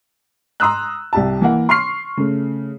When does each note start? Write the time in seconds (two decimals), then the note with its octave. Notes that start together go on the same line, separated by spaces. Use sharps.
0.60 A#5 C6 D#6 E6 F#6
1.13 C2 G4 A5
1.41 E3 A#3 F#5
1.69 C6 C#6 F6 C7
2.17 C#3 A3